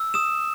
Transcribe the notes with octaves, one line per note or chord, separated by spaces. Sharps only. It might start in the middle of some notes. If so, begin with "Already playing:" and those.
Already playing: E6
D#6 E7